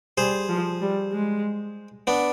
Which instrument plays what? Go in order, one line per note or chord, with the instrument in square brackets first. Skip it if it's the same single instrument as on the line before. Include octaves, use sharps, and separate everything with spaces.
[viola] G3 [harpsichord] G#4 C5
[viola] F3
G3
G#3
[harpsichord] B3 D4